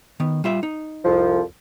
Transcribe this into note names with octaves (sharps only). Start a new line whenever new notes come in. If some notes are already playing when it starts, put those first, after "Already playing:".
D#3 B3
G3 F4 E5
D#4
C2 F2 F3